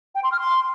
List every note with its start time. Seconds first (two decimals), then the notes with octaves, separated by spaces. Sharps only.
0.15 G5
0.23 C6
0.30 F6
0.38 C6